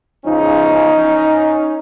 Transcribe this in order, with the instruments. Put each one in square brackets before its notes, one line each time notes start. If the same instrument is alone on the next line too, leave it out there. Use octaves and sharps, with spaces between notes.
[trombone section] E2 C#3 F3 C#4 D#4